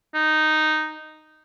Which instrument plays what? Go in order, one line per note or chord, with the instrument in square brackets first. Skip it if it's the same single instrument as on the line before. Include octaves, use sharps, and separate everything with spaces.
[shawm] D#4